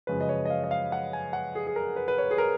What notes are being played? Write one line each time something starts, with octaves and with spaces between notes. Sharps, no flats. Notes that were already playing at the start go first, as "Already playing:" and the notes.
F#2 C#3 F3 G#3 B4
D#5
C#5
D#5
F5
D#5
F5
F#5
G#5
F#5
G#4
G#4
A#4
B4
B4
C#5
G#4
A#4